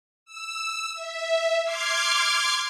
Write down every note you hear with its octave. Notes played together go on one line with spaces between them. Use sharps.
E6
E5
C6 D6 F6 G#6 C7